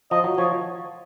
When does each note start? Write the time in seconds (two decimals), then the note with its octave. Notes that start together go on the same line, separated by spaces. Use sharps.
0.11 F3 D#5
0.24 F#3
0.37 F3 C#5